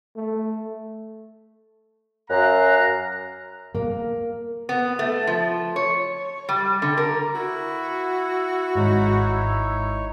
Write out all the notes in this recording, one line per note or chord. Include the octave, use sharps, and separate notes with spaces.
A3
F#2 F5 A#5 F#6
A#3
B3
A3
F3
C#5
G3
D3
A#4
E4 F#4
G#1 G#2 D#4 C#5